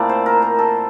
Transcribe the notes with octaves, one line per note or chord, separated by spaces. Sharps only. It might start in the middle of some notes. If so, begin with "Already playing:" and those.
Already playing: A#2 A3 C4 E4 D5
C5
A#4
A#4
A4